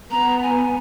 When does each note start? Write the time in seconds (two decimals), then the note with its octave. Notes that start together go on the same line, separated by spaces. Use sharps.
0.11 B3 A#5
0.42 G#5